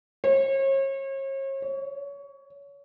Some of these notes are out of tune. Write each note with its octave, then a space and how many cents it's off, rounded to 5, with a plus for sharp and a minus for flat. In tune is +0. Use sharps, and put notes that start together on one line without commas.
C#5 -40
C#5 +25